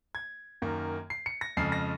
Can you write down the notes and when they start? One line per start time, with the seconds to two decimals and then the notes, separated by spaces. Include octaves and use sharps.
0.15 G#6
0.62 F#2 D#3 A#3
1.10 C7
1.26 C#7
1.41 A#6
1.57 F2 C#3 F3 G#3 C7
1.72 A#6